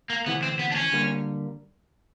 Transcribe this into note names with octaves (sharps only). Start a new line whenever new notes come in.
A#3
D2 C3 E3 B3
C4
B3
D4
C#4
D3 G3 A#3